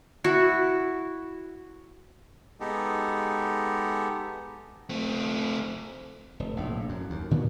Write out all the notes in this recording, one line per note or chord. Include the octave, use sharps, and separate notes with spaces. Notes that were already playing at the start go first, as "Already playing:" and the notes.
E4 F#4
G#3 B3 D#4 G4 A4
A3 C4
F1
A#1 A2
F#2
D#2
A#2 D#3 F#3 B3